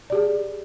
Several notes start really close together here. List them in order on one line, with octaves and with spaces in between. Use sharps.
D5 G4 G#4